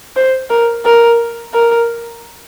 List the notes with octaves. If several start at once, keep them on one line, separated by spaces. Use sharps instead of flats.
C5
A#4
A#4
A#4